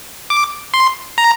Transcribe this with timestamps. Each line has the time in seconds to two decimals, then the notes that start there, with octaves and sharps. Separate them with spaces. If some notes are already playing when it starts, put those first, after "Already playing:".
0.30 D6
0.74 C6
1.18 A#5